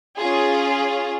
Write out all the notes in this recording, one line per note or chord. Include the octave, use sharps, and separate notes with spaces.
C#4 F4 G#4